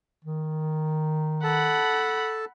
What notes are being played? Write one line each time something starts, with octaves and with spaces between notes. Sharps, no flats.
D#3
A4 F#5 A5 B5